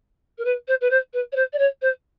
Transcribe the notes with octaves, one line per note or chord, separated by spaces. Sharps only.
A#4
B4
C5
B4
C5
B4
C#5
C5
D5
C#5
C5